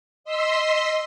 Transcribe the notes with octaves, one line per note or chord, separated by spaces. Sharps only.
D#5 C6 E6 B6